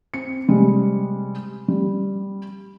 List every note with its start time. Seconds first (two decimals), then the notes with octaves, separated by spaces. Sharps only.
0.14 C4 C#7
0.48 C3 G3 G#3
1.68 G3